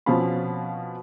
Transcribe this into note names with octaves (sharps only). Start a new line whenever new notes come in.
B2 F3 C4 C#4 F5 B5